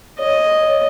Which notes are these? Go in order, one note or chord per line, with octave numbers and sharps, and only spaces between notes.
C#5 D#5